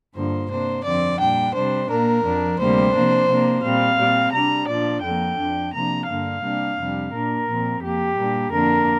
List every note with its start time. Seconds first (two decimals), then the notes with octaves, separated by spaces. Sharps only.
0.15 G2 D3 F3 A#3 C5
0.50 C3 A#3 D4 C5
0.84 F2 D3 F3 C4 D5
1.19 A#2 G3 D4 G5
1.55 C3 G3 D4 C5
1.89 A#2 A#3 D4 A#4
2.24 F2 F3 D4
2.59 D2 C3 G3 A#3 C5
2.94 C3 F3 A#3 D4
3.28 C3 A#3 D4
3.63 A#2 G3 C4 F5
3.98 A#2 G3 C4
4.33 C3 G3 D4 A#5
4.68 A#2 F3 D4 D5
5.03 F2 D3 F3 A#3 G5
5.38 F2 F3 D4
5.73 C3 F3 A#3 D4 A#5
6.07 G2 D3 A#3 D4 F5
6.42 C3 G3 A#3 D4
6.78 F2 C3 G3 D4
7.13 A#2 A#3 D4 A#4
7.47 A#2 F3 C4
7.82 F2 F3 A#3 G4
8.17 A#2 G3 A#3 D4
8.52 F2 D3 A#3 D4 A#4